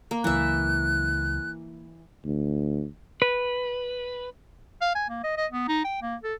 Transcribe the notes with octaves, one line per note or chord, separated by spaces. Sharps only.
A#3
C#2 E3 F#3 E5 F#6
D2
B4
F5
G#5
A#3
D#5
D#5
B3
D#4
G5
A#3
A4